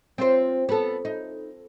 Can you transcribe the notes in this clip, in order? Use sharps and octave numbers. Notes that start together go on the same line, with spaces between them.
C4 F4 C5
B3 A4
D#4